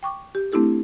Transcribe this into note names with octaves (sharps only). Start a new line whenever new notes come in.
G5 C#6 D6
G4
A3 C4 D4 E4 G4 A4